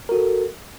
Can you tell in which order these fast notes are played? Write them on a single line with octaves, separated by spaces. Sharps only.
A#4 F#4 A4